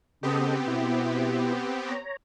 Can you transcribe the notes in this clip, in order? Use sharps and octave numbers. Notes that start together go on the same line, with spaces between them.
C#3 B3 C4 G4 A4 D#5
B2 E4
C#5 A#5